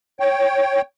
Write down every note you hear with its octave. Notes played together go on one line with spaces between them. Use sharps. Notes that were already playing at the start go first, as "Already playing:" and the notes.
C#5 G5